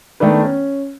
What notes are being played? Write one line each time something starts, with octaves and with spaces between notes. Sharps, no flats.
D#3 A3 B3 D4 B4
C#4